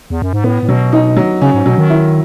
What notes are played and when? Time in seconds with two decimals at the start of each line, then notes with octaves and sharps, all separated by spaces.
0.10 E2
0.22 F#2
0.33 G#2
0.44 A2 B3
0.63 A2
0.69 B2 F#3
0.93 D#4
1.16 F#3
1.42 C#3 C#4
1.54 G#2
1.66 B2 F#3
1.78 D#3
1.90 E4